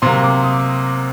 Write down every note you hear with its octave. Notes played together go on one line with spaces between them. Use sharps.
C3 F#3 A#3 C6
D6
D#6